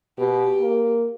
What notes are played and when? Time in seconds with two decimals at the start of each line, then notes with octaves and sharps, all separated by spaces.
0.19 B2 G4
0.61 A#3